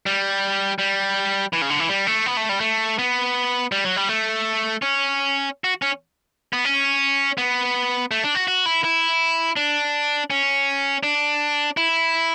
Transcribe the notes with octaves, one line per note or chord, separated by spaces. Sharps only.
G3
G3
E3
C#3
D3
E3
G3
A3
B3
A3
G3
A3
B3
G3
F#3
G3
A3
C#4
F#4
C#4
B3
C#4
B3
A3
D4
F#4
F#4
E4
E4
D4
C#4
D4
E4